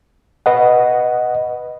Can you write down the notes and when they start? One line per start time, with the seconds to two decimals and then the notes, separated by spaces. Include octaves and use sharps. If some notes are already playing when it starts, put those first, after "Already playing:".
0.46 B4 D#5 F#5